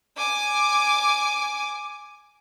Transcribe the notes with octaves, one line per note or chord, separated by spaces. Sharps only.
G#5 D6